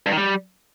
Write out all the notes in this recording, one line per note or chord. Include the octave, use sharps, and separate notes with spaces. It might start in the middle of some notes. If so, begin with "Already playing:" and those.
G2
D#3
G3